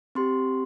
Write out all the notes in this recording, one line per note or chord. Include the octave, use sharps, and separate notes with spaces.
C4 G4 C6